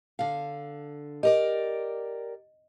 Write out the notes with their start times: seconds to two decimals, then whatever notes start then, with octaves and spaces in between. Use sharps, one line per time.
0.19 D3 F5
1.23 G4 A#4 D5 D#5